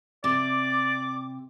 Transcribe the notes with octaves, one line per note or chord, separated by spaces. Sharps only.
C3 D5 D6